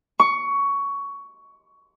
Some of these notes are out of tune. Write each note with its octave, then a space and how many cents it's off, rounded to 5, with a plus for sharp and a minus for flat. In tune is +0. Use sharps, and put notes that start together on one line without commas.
C#6 +15